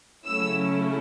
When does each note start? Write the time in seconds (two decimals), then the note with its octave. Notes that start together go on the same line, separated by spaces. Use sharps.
0.24 C#3 F#3 A3 C#4 E4 E6